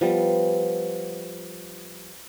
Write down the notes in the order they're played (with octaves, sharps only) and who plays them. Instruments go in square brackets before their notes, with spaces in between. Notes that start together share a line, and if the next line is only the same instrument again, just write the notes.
[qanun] F3 G3 B3